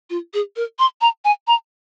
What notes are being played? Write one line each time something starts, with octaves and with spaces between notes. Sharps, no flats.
F4
G#4
A#4
C6
A#5
G#5
A#5